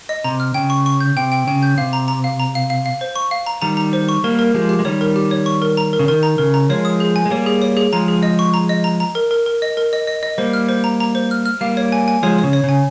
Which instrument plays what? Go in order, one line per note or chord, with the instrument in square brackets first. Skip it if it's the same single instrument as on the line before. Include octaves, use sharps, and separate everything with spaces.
[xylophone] D#5
[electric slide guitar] C3 [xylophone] A#5
[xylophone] F6
[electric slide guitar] C#3 [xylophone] G5
[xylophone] C#6
C#6
G6
[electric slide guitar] C3 [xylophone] G5
[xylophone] G5
[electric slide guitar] C#3 [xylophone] G5
[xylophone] G6
[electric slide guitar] C3 [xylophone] F5
[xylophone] A#5
A#5
F5
A#5
F5
F5
F5
C5
C#6
F5
A#5
[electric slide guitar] D#3 G3 [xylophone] A#5
[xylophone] A#5
C5
C#6
[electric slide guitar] G3 A#3 [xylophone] A#4
[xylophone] A#4
[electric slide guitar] F3 G#3 [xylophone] G4
[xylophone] G4
[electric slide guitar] G#3
[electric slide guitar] D#3 G3 [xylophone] C#5
[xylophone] A#4
G4
C#5
C#6
A#4
A#5
A#4
[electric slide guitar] C#3
[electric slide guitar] D#3 [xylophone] A#4
[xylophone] A#5
[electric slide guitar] C#3 [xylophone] A#4
[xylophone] A#5
[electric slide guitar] F3 G#3 [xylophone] C#5
[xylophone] D#6
G#4
G#5
[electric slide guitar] G#3
[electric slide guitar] G3 A#3 [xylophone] C#5
[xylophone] G#4
C#5
G#4
[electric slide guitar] F3 G#3 [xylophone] A#5
[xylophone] G#4
D#5
C#6
A#5
D#5
A#5
A#5
A#4
A#4
A#4
D#5
A#4
D#5
D#5
D#5
[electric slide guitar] G3 A#3 [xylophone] C5
[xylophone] F6
C5
A#5
A#5
C5
F6
F6
[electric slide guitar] G3 A#3 [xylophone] F5
[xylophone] C#5
G#5
G#5
[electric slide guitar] F3 G#3 [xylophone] C#5
[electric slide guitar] C#3 [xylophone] C#5
[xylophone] C#5
[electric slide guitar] C#3 [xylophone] G#5